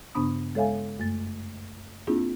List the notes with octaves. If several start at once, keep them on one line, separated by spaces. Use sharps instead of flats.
G2 C#3 B3 D4 B5 D#6
G#3 A4 C#5 E5 F5 G#5
F#2 A3 A6
A#3 C4 D4 E4 F4 G#4